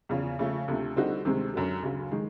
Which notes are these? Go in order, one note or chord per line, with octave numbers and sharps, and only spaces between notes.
E2 C#3 F3
C#3 F3 A3
D2 C3 F3 A3
D3 G3 C4 D#4 F#4
D2 C3 D#3 G#3 C4
F#2 D3 F#3
D2 C#3 F#3
D#3 G#3